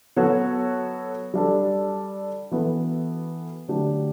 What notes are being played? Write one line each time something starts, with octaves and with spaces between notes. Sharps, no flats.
F#3 B3 F#4 A4 C#5
G3 D4 A4
E3 B3 F#4 A4
D3 F#3 A3 D4 G4